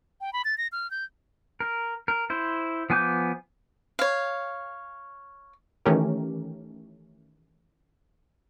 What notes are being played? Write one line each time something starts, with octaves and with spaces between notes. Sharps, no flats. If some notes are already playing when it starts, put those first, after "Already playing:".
G5
B5
A6
A#6
F6
G6
A#4
A#4
E4 C5
F3 B3 G#5 D6 G6
C#5 F5
D#3 E3 A3 C#4 G4 A#4